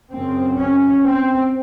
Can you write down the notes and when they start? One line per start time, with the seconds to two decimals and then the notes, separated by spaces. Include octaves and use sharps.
0.11 F#2 C#3 C4
0.59 C#4
1.06 C4